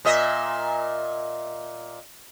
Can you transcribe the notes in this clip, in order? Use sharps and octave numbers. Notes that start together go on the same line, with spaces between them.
A#2 D#5 E5